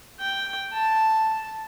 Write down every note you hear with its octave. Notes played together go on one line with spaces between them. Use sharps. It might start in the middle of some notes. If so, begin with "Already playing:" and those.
G5
A5